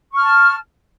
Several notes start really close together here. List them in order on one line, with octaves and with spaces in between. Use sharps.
C#6 F6 A5